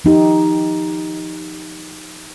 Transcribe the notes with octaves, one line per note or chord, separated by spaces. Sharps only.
F3 D#4 G4